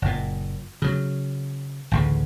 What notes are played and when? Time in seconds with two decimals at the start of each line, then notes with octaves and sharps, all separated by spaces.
0.02 F#1 A#2
0.82 C#3 F#3
1.91 A1 D2 C#3